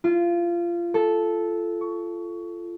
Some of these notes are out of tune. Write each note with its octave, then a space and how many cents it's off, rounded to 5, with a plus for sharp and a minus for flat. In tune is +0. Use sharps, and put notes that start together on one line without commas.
F4 -25
A4 -10
C#6 +20